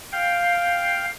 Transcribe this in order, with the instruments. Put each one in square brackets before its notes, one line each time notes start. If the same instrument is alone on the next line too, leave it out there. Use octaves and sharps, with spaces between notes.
[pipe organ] F5 G5